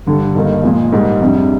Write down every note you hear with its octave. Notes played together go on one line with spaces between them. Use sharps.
G2 D3 G3 D4
G2 D#3 A#3 D#4
A#2 F3 G#3
G#2 G3 A#3
F2 C3 G3 D4